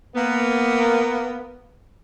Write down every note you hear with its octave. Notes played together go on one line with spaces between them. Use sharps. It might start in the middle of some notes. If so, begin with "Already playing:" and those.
A#3 B3